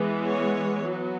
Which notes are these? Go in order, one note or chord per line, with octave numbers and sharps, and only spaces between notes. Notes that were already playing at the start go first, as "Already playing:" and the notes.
Already playing: E3 G#3 B3
C#5
F#3 B3